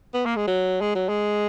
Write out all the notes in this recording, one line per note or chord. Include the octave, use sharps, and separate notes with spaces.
B3
A#3
G#3
F#3
G#3
F#3
G#3